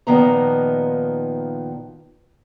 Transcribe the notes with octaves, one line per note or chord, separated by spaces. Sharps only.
A#2 D#3 F3 B3 D#4 A#5